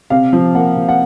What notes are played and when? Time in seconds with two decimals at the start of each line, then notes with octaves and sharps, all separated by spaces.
0.10 C3 F5
0.33 F3
0.55 A#3 F#5
0.77 C3
0.89 F#5